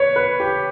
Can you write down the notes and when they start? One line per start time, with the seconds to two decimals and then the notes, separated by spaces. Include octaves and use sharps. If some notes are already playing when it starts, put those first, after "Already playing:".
Already playing: B4 C#5
0.16 B4
0.40 G4